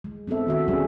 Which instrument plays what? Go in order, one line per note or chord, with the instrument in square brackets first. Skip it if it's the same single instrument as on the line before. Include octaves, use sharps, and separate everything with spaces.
[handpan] G#3
B3 C4 D4 A4 E5
D#3 F#4 E5
G3 G#3 C#4 D4 G#4